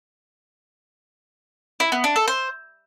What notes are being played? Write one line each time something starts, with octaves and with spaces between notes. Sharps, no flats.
E4
B3
D4
A4
C5